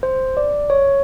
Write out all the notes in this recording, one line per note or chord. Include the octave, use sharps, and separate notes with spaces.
C5
D5
C#5